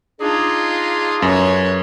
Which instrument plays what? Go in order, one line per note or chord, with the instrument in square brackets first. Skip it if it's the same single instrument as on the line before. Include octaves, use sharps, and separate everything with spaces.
[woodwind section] D4 G#4 [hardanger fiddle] D#4 F4
[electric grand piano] F#2 [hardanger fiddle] B4 C#5